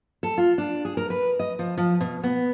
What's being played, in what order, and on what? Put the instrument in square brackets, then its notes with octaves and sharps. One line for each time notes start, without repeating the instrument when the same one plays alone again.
[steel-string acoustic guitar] A4
F4
D4
G#4
A#4
B4
D#5
F3
F3
B2
B3